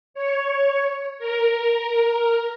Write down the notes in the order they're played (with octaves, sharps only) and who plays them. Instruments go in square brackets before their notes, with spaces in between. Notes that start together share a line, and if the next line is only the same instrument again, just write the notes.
[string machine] C#5
A#4